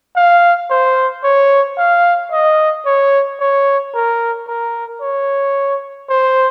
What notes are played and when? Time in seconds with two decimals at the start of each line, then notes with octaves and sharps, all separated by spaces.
0.16 F5
0.70 C5
1.24 C#5
1.78 F5
2.32 D#5
2.86 C#5
3.40 C#5
3.94 A#4
4.48 A#4
5.01 C#5
6.10 C5